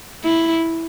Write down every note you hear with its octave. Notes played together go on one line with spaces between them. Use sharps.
E4